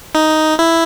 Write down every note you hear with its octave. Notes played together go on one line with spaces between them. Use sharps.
D#4
E4